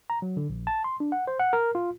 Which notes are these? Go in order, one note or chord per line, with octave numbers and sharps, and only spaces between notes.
A#5
F#3
D3
A#1
A5
C6
D4
F#5
C5
F#5
A#4
F4